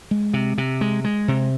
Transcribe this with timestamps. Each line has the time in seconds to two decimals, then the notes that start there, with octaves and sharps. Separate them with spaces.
0.11 G#3
0.33 C3
0.58 C3
0.81 G#3
1.04 G#3
1.28 C3